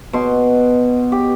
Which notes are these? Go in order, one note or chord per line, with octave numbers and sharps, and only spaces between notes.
B2 C6
G4